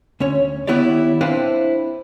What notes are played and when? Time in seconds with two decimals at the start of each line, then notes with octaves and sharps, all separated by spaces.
0.20 D2 C#4 C#5
0.67 D#3 B3 E4 G4 C#5 D5
1.21 C4 D4 E4 B4 C5 F5